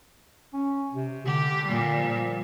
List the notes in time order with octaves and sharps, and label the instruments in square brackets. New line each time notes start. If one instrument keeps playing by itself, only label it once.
[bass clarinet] C#4
C3
[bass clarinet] D3 [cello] G4
[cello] A#2 G3
[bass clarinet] F3